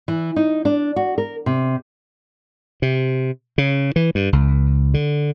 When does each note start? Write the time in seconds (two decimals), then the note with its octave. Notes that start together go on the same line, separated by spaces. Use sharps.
0.08 E3
0.36 D#4
0.65 D4
0.96 F#4
1.18 A#4
1.46 C3
2.82 C3
3.58 C#3
3.96 E3
4.15 G2
4.33 C#2
4.94 D3